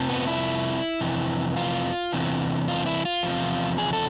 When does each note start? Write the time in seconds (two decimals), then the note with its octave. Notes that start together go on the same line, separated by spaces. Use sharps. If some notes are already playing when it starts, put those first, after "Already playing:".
Already playing: F2 C3 F3
0.08 B3
0.27 E4
1.01 F2 C3 E3
1.56 F4
2.12 E2 C3 E3
2.68 F4
2.86 E4
3.05 F4
3.23 E2 C3 F3
3.78 G#4
3.93 A4